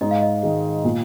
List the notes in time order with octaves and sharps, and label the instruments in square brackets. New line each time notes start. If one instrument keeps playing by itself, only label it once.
[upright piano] G#2 [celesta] D#5
[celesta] F5
D#5
[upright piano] D#3 G#3
A#2